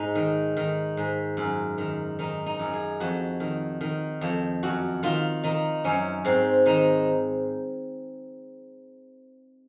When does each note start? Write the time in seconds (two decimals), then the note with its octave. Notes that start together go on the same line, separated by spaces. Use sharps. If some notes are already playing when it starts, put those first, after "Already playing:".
Already playing: G#2 D#4
0.15 D#3
0.57 D#3
0.97 G#2
1.37 F#2
1.78 D#3
2.19 D#3 D#4
2.46 D#4
2.59 F#2
2.73 G#4
3.00 F2 F#4
3.40 D#3
3.81 D#3
4.21 F2
4.63 F#2 F#4
5.03 D#3 F4
5.43 D#3 D#4
5.84 F#2 C#4
6.25 G#2 C4
6.66 D#3 D#4